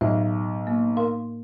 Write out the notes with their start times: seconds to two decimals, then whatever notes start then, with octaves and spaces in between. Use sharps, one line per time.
0.01 B1 A2 E5
0.67 A#3
0.97 A#4 F5 C6